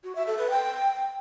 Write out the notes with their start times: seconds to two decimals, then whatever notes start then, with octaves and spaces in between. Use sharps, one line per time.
0.04 F#4
0.15 E5
0.27 A4
0.39 B4
0.50 G5